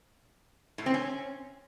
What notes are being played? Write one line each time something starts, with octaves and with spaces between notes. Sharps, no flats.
A2
C4
C#4